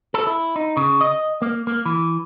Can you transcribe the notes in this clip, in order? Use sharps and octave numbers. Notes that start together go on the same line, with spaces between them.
A4
E4
D#4
C#3
D#5
A#3
A#3
E3